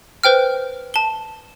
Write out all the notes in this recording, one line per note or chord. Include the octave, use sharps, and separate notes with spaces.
B4 C5 G5 F6
A5 G7